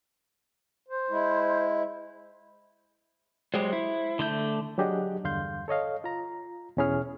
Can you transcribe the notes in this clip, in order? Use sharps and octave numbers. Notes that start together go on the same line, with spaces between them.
C5
G#3 E4
F#3 G#3 G4 C5
E4
D3 A3 G6
F#3 D4 G4 G#4 D#5 F#5
E2 G2 D3 F5 C6 G6
A4 C#5 D#5 F5
F4 A#5
E2 B2 C#4 E4 G#4 F6